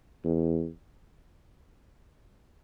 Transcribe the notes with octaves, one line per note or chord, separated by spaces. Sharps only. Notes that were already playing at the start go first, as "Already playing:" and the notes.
E2